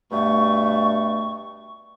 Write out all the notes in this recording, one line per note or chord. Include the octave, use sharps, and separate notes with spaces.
G2 B2 A3 C#6